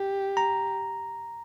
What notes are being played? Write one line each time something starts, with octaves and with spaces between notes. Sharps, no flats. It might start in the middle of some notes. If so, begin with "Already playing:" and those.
Already playing: G4
A#5